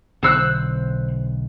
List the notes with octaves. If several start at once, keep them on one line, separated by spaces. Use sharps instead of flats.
B1 D3 B3 C5 E6 F#6